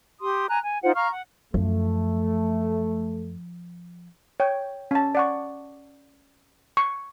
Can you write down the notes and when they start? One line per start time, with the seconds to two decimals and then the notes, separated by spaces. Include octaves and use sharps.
0.20 G4 C6 D#6
0.49 G#5 A#5 F#6
0.62 G#5
0.83 D#4 F4 C5 F#5
0.95 F5 A#5 C#6 F6
1.11 F#5
1.54 F#2 F3 A3
4.40 C#5 G5
4.91 C#4 A5
5.15 D5 F#5 C#6
6.77 C#6